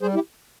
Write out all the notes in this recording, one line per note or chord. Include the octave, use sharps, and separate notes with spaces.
G3 G#4 C5
E4 G4